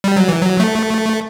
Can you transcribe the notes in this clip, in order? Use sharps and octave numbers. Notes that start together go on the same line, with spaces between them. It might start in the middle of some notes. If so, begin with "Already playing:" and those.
G3
F#3
E3
F#3
A3